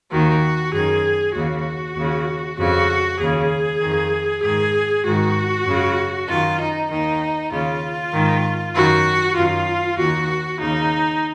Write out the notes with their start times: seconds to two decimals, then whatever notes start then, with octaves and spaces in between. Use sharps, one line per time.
0.11 D#2 D#3 F#4
0.73 F#2 D#3 G#4
1.35 D#2 C#3 F#4
1.97 D#2 C#3
2.58 F2 C#3 F#4
3.21 D#2 C#3 G#4
3.81 D#3
3.86 F2
4.43 G#2 D#3 G#4
5.05 G#2 D#3 F#4
5.66 F#2 C#3
6.28 F#2 D#3 F4
6.60 D#4
6.90 D#2 D#3 D#4
7.52 D#2 C#3 F4
8.13 G#2 D#3
8.75 F#2 D#3 F#4
9.37 F#2 D#3 F4
9.98 D#2 D#3 F#4
10.60 D#2 C#3 D#4